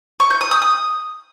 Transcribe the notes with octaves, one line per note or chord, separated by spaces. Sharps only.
C#6
G6
D#6
D#6
D#6